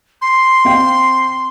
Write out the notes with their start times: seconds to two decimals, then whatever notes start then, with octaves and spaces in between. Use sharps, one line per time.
0.22 C6
0.65 C4 F5 G5